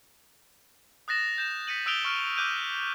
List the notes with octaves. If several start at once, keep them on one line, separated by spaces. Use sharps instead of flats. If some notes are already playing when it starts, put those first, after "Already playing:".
D#6 F#6 A6 A#6 E7
G6 E7
A#6 B6 C#7 D#7 F#7
D#6 E6 F#6 D7 F7 G7
C#6 F6 D7
D6 F#6 G6 D#7 F7